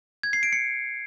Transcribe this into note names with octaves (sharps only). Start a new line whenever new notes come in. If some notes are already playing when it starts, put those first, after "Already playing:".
G#6
C7
D7
C#7